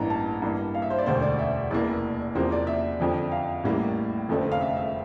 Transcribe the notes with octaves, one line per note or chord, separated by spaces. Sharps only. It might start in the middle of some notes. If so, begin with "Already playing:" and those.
Already playing: A1 G2 E3 A#3 A#5
A5
G2 E3 A#3
F5
E5
C5
D5
E1 D2 D3 G3 C5
D5
E5
F1 E2 E3 A#3 D5
E2 C3 F3 A#3 C5
D5
E5
F2 D3 F3
F5
A1 A2 E3 G3 A#3
F1 F2 D3 A3 C4
F5
E5
E5